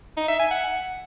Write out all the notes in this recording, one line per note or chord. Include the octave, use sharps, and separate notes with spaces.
D#4
E5
G#5
F#5